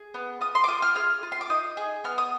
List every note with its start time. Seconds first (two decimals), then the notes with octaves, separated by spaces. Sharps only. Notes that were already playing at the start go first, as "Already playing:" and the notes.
Already playing: G#4
0.14 B3
0.41 F4 D#6
0.55 C6
0.64 D6
0.68 F4 D#6
0.82 F6
0.95 G#4 F6
1.23 F4
1.32 C6
1.41 D6
1.50 D#4 D#6
1.77 G#4
2.04 B3 F6
2.18 D#6